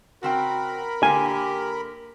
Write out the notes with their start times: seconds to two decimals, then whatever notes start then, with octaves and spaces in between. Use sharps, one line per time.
0.23 C#3 C4 F#4 A#4 G5 B5
1.03 D3 A#3 G4 G#5